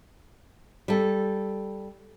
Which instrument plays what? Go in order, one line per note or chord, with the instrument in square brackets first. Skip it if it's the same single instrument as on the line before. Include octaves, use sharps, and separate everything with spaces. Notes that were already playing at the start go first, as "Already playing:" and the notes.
[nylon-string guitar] G3 A4